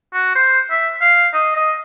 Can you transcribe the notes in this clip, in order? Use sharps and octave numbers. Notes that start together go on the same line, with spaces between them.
F#4
C5
E5
F5
D#5
D#5